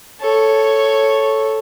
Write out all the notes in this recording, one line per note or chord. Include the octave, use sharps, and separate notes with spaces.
A4 C#5